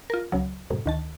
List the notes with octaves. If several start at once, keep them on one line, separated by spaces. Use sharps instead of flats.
F4 A#4
C#2 C#3 F#3
F#2 A2 C3
D2 D#3 A5